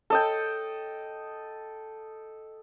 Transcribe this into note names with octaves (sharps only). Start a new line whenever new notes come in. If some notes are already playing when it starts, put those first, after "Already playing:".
A4 D#5 G5